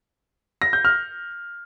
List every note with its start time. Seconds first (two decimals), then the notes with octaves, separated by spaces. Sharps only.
0.62 A#6
0.73 G6
0.85 F6